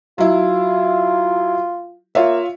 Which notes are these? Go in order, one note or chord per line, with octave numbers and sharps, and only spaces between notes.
F#3 E4 F4
A#3 F4 C#5 E5